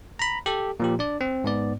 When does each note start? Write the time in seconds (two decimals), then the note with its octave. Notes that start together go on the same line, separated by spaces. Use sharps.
0.19 A#5 B5
0.46 G4 A4
0.80 A#2 F3 G4
0.99 D4 D5
1.21 C4
1.44 G#2 B3 D5